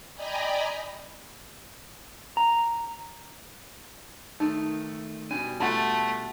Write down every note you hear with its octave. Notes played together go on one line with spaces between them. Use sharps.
D5 D#5 G5 G#5 A#5 B5
A#5
D#3 A3 D#4
B2 G3 C#4 G#5
A3 F4 F#5 A5 C6